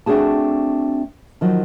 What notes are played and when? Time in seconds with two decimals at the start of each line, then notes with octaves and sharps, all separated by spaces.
0.06 A3 C4 D4 F#4 G#4 A5
1.41 D#3 F3 F#3